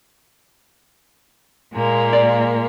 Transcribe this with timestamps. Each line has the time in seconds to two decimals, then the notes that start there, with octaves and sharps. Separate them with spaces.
1.74 A#2 G#3 A#3
2.13 D5